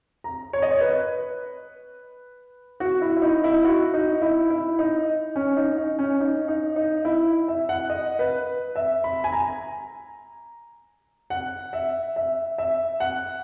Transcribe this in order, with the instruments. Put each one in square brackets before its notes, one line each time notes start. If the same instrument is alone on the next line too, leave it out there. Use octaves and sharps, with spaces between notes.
[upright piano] A#5
C#5
D#5
C#5
B4
F#4
E4
E4
D#4
E4
F#4
D#4
E4
E4
D#4
C#4
D#4
D#4
C#4
D#4
D#4
D#4
E4
E5
F#5
D#5
B4
E5
B5
G#5
A#5
F#5
E5
E5
E5
F#5